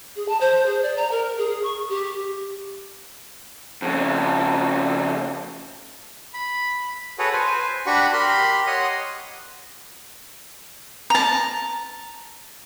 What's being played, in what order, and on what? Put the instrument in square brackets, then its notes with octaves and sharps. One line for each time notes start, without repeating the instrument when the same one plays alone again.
[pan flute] G#4
A5
C5
G#4
D5
A#5
A#4
G#4
C#6
G4
[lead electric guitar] F2 C#3
[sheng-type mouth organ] B5
F#4 G#4 A4 B4 C#5 F#5
B4 C5 G#5
D4 F#4 G4 F#5 B5 C#6
G4 A#4 B5 C6
C#5 D#5 F#5 C6 D#6
[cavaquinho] A5 A#5